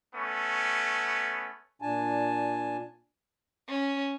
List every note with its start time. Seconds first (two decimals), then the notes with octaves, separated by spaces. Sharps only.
0.15 A3 B3 C#4
1.82 A#2 D4 G#5 A5
3.68 C#4